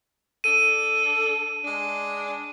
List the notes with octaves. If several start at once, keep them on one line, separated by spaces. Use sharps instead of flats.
D4 A4 D#7
G#3 D4